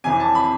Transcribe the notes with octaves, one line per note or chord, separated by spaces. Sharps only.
F2 C3 E3 G#5
A5
B5